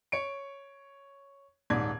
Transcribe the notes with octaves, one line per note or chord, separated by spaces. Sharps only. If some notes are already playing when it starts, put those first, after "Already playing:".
C#5 C#7 D7
D#1 G#2 D5 G#6